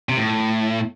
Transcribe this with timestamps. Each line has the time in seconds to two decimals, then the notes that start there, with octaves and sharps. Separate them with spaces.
0.09 C3
0.18 A2